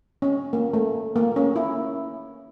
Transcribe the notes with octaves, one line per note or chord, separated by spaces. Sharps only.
C#4
A#3
A3
A#3
C#4
E4